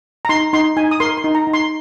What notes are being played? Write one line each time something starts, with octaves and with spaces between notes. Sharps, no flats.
A#5
D#4 C6
D#4 C6
D#4 G#5
D#6
A#4 C6
C6
D#4
A#5
D#4
C6